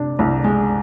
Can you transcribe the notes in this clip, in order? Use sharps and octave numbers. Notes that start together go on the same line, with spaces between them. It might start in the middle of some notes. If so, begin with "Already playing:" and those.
Already playing: C3 D4
C2
G#3